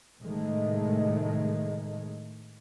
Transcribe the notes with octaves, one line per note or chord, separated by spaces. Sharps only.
A2 C3 D#3 G#3 A3